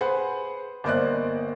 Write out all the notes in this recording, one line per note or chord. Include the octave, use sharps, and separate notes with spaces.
G#4 B4 C5 F#5
G1 A#3 C5 D5 D#5 F#6